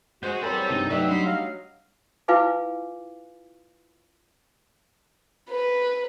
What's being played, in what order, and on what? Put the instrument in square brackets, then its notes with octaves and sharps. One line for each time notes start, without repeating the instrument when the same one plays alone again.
[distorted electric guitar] G#3 [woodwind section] F#4 [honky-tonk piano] C5 G6
[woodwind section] E2 C4 A4 [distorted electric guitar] G3 B5 [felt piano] A#4 C#5 C6
[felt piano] C2 G2 [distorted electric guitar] D#4
[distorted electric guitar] F#3 [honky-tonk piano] A3 D#4 [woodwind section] G4 B4 E5 [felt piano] D5 E6
[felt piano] G3 D4 [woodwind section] D#5 B5 C6
[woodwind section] F#3 D#5 F5
[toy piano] E4 F4 B4 F5 G#5 D6
[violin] B4